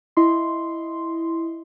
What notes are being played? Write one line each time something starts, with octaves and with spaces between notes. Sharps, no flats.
E4 D#5 C6